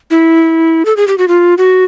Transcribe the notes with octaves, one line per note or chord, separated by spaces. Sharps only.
E4
A4
G#4
G4
F#4
F4
F#4